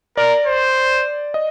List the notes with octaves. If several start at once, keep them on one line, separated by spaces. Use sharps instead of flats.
A#4 D5
C5
D#5